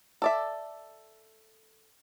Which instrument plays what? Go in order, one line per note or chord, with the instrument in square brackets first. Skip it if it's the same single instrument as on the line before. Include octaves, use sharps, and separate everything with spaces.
[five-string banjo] A4 D5 E5